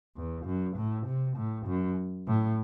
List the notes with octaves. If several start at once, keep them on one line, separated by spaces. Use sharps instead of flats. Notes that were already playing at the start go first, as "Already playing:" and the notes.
E2
F#2
A2
C3
A2
F#2
A2